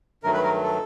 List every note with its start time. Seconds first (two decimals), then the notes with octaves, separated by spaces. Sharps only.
0.23 G2 D#3 F#3 A3 A#4
0.34 B4
0.43 A#4
0.63 A4